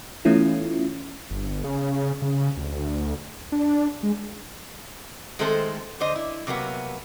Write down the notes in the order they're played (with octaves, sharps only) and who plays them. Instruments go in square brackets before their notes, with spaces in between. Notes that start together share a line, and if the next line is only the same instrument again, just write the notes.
[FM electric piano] E3 A3 B3 C#4 E4 F4
[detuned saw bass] G1
C#3
C#3
D2
D4
G#3
[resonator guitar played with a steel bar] D#3 G#3 A3 C4 A4 C5
D3 C5 D#5
E4
C3 F#3 A#3 B3